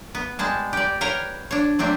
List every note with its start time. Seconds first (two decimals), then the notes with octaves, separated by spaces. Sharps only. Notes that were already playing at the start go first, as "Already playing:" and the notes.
0.15 B3
0.39 G3 G#3 A5
0.73 G4 D5
1.01 A#4 B4 C#5 F5 G5 A#5
1.51 D4 C#5
1.79 F#3 A3 C4 D4